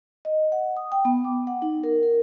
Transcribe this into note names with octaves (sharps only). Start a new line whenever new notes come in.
D#5
F#5
D#6
G5
B3
D6
F#5
D#4
A#4
A#4